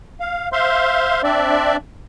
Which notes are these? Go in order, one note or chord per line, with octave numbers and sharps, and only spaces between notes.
F5
C5 E5 F5 C6
C4 D4 D5 E5